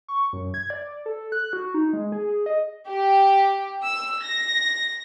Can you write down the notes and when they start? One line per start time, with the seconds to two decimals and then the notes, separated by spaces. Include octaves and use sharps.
0.08 C#6
0.33 F#2
0.54 G#6
0.70 D5
1.06 A4
1.32 F#6
1.53 F#4
1.74 D#4
1.93 G#3
2.12 G#4
2.46 D#5
2.88 G4
3.86 E6
4.23 A#6